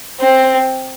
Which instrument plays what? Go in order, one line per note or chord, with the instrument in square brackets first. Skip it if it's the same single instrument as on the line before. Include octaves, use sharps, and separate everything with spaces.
[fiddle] C4